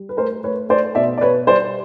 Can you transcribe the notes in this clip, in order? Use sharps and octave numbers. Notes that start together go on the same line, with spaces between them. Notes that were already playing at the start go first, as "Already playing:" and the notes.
Already playing: G3
B4
A3 A#4 C5
A3 B4 C#5
A3 C5 D5
B2 D5 E5
D5
B2 B4 C#5
G3 C5 D5